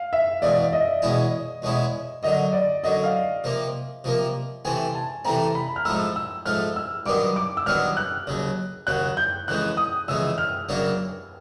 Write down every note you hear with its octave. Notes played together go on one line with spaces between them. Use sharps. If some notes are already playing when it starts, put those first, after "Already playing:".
Already playing: F5
E5
E2 B2 G#3 D5
D#5
E2 B2 G#3 C#4 E4
E2 B2 G#3 C#4 E4
F#2 D3 F#3 D#5
D5
F#2 D3 F#3 D#5
F5
C3 F3 A#3
C3 F3 A#3
C3 E3 A3 C4 G#5
A5
C3 E3 A3 C4 A#5
B5
F6
G#2 F3 A3 E6
E6
G#2 F3 A3 F6
E6
G2 D#3 F#3 B3 D6
D6
E6
G2 D#3 F#3 B3 F6
F#6
D#2 C#3 F#3
D#2 C#3 F#3 F#6
G6
F2 C#3 E3 G#3 F#6
D#6
F2 C#3 E3 G#3 E6
F6
F#2 C#3 F#3 A#3 D4